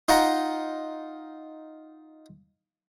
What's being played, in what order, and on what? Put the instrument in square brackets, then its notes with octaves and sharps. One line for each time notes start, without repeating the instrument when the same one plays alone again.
[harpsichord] D#4 F4 F#5 A#5